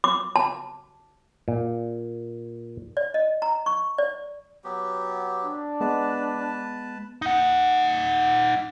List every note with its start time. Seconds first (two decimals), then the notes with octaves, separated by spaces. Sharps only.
0.04 D6
0.36 A5
1.48 A#2
2.97 D5
3.14 D#5
3.42 A#5
3.66 C#6
3.98 D5
4.64 F#3 B3 G4
5.45 D4
5.81 G#3 B3 B4 A5
7.22 D#4 F#5